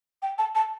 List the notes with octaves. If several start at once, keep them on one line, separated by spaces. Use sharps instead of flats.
G5
A5
A5